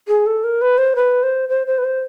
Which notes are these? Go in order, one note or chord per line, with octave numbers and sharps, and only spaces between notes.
G#4
A4
A#4
B4
C5
B4
C5
C5
C5
B4
C5